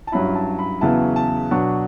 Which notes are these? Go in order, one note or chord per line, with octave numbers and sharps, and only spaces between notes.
A5
G2 F#3 C#4 E4 B5
A5
B5
E2 C#3 F#3 B3 E4 A5
A5
B2 F#3 B3 D4 C#6